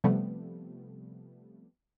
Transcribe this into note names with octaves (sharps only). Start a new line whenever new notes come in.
C3 F3 G3 A3 B3